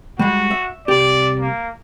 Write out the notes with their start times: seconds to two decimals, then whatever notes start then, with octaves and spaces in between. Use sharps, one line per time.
0.19 G3 G#3 F#4
0.51 E5
0.88 C2 G4 D5
1.40 A#3